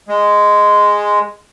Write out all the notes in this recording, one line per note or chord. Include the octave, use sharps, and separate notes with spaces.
G#3